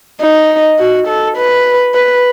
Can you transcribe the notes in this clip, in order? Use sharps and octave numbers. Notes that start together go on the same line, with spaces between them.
D#4
F#4
A4
B4
B4